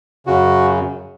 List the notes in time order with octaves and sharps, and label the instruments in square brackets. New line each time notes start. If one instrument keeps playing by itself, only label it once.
[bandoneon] F#2 C#3 F#4